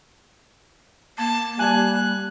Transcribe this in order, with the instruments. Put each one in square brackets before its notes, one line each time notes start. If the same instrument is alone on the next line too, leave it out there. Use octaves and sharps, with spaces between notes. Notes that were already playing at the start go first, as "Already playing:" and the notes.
[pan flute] A#3 [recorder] A5
[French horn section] G3 [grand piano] G#5 A5 G#6 [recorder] F#6